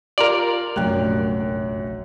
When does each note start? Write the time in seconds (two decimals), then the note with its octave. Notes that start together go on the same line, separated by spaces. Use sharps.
0.18 F4 G4 A#4 D5 C6
0.76 F1 A#1 F#2 G5 F#6